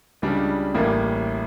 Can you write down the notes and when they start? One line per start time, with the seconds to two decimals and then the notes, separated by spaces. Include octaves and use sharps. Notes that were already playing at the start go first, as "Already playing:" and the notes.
0.22 C#2 C#3 G3 D4
0.75 A1 A2 G3 A#3